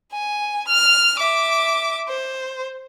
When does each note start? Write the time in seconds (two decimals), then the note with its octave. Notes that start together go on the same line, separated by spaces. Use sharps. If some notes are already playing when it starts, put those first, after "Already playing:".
0.13 G#5
0.68 F6
1.18 E5 D6
2.08 C5